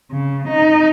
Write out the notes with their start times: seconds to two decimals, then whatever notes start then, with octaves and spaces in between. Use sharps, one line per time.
0.12 C#3
0.48 D#4